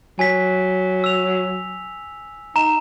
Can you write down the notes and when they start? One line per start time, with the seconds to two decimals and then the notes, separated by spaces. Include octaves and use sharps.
0.19 F#3 G#5 B6
1.04 E6 F7
2.56 D#4 A#5 E7